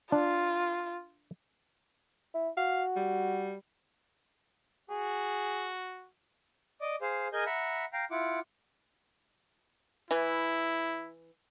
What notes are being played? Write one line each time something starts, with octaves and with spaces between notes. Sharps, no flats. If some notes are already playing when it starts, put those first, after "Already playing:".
D4 F4
E4
F#4 F5
G3
F#4 G#4
D5 D#5
G#4 C5 F5
G#4 A#4 D#5 G#5 G6
E5 F#5 A#5 B5
F5 G5 A#5
E4 F4 F#5 D6
E3 E4